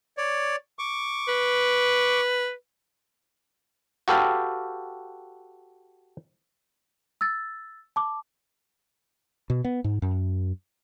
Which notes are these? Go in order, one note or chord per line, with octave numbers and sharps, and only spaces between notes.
C#5 D5
C#6 D6
B4
F#4 G4 A4 B4 F5 G5
E6 A6
A5 D6
B2
B3
G#2
F#2